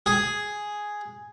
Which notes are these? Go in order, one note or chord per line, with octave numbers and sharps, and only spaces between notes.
G#4